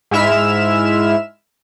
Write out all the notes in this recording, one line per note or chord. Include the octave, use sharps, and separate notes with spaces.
G#2 G#3 E4 E5 F6 E7